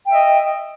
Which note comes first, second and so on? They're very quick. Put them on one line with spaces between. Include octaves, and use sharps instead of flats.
G5 E5 D#5